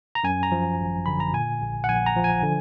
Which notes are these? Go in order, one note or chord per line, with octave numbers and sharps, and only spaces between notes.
A#5
F#2 G#5
A#5
F3
G#1
D3 B5
A#5
A#2 G#5
A#1
F#5
A#1 G#5
A#5
F3
G#5
D3